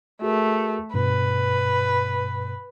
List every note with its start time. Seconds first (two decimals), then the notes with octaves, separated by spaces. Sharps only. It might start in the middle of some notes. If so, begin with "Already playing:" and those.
0.22 A3 F#4 G#4 A#4
0.94 G2 B2 B4